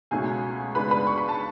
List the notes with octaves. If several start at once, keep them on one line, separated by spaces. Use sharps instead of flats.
C#2 B2 A3 C#4 G#4 G#5
C#2 C#3 G#3 B3 D4 B4 B5
B4 B5
C#6
B5
A5